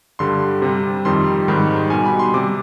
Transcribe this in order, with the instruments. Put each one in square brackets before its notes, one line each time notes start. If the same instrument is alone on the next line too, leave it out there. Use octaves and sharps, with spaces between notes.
[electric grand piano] G2 D3 G3 C6
C3 G3
F2 D#3 G3 C6
G#2 D#3 G3 B5
B2 G3 G#5
B5
C6
C3 G3 D6